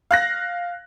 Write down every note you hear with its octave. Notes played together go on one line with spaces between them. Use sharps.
F5 F#6 A#6